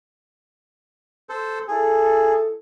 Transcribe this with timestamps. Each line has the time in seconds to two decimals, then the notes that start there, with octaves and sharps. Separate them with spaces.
1.29 A4 C5
1.68 E4 G#4 A4